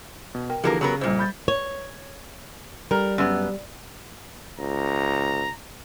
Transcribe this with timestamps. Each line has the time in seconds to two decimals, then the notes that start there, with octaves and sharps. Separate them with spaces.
0.35 B2
0.50 A#4 G5
0.64 D3 E3 F3 A#3 G4 G#4 A#4
0.81 C#3 F#3 B3 A#4
1.01 F2 A#2 G3 C5
1.19 B5 G6 A6
1.48 C#5
2.91 G3 A#4
3.18 F#2 B3
4.59 C#2 A#5